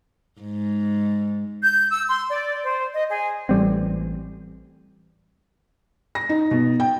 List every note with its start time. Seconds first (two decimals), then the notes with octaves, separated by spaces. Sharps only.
0.41 G#2
1.61 G6
1.91 E6
2.08 C6
2.29 D5
2.64 C5
2.94 D#5
3.09 G#4
3.49 A1 G3 C4
6.15 A#6
6.29 D#4
6.51 B2
6.80 G5